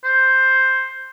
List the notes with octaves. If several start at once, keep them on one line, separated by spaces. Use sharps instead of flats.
C5